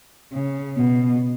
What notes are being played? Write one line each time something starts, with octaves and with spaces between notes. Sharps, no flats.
C#3
B2